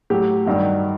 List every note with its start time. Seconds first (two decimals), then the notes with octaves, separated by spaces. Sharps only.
0.10 A2 F#3 G4
0.46 G2 D#3 F#3